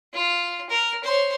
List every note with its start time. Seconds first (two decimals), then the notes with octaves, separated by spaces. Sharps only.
0.14 F4
0.69 A#4
1.04 C5 C#5